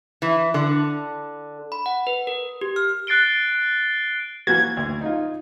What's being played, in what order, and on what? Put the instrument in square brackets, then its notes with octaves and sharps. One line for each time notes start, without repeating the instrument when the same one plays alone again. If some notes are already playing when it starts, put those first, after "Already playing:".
[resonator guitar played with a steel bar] E3
D3
[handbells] B5
F#5
B4
A#4
G4
F6
[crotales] F#6 A6 C7 D7 G7
[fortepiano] E3 A#3 F#4 [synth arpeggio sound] G#6
[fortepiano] D2
D#4 F4